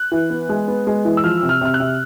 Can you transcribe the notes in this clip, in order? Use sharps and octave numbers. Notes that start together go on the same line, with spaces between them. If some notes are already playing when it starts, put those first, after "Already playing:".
Already playing: F#6
E3
B3
G#3
B3
G#3
E3
E6
F3 F6
C3
F6
C3 F6
F#6
C3